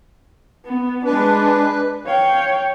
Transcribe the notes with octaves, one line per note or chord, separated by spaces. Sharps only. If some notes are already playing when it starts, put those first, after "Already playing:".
B3
G#3 D4 B4
C#5 F5 G5